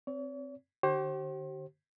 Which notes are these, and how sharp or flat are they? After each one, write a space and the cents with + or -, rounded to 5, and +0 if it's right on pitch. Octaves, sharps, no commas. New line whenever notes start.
C4 +0 C#5 +45
D3 +25 G4 -40 C5 +35